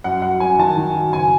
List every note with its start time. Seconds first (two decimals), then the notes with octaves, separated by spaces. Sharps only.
0.04 F#2 F#5
0.22 F#3 F#5
0.40 F#2 G#5
0.58 D#3 A5
0.78 D#3
0.96 F#3
1.13 F#1 G#5